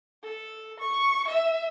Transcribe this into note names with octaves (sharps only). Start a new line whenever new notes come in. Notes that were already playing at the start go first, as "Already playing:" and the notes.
A4
C#6
E5